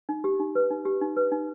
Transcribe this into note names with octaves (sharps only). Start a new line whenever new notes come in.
D#4
G4
D#4
B4
D#4
G4
D#4
B4
D#4